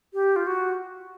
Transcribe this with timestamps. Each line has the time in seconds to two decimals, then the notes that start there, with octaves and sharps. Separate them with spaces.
0.14 G4
0.36 F4
0.47 F#4